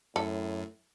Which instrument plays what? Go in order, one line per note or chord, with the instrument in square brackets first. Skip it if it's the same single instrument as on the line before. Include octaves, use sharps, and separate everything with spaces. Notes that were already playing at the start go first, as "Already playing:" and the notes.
[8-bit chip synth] F#2 [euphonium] A2 [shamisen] A4